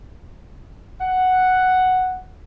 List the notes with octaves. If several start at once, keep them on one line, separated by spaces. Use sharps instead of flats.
F#5